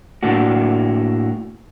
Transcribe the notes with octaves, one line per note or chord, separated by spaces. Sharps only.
A2 A#3 D4 F#4